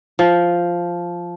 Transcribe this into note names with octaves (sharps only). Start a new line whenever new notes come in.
F3